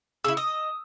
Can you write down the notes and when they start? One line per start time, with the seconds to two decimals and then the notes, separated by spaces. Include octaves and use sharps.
0.24 C#3 E4 E6
0.37 D#5 D#6